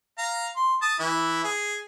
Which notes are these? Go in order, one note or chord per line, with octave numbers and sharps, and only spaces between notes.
F5 A#5
C6
A5 D#6
E3 E4
G#4